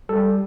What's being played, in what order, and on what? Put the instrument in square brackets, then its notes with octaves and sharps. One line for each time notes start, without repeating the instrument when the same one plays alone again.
[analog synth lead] G3 [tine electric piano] A4